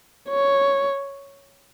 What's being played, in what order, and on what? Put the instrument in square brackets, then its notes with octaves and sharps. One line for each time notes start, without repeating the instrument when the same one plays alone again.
[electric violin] C#5